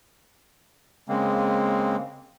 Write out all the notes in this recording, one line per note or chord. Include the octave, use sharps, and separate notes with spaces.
C#3 G#3 A#3 C4